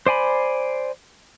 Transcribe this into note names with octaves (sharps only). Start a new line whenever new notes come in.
C5 D5 G#5 B5